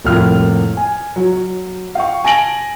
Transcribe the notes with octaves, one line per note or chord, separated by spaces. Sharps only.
C2 F2 A2 A#3 F4 F6
G#5
F#3
F#3
F5 G5 C#6
G#5 A5 A#6 D7 F#7